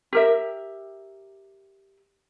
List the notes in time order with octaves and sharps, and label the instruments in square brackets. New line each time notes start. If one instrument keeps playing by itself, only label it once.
[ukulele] G4 A#4 E5